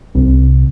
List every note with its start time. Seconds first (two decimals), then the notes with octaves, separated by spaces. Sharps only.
0.15 C2